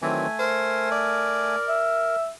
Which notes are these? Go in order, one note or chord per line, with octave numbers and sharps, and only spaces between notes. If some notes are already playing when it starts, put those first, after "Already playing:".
D#3 E3 F#3 A3 C4 G#5
A#4 C5
D5
E5